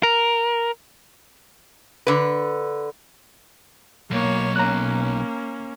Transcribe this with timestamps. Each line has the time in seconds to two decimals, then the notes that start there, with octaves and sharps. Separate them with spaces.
0.03 A#4
2.07 D3 B4
4.11 B1 A#3 C#5
4.56 A#3 C#4 A#5 F#6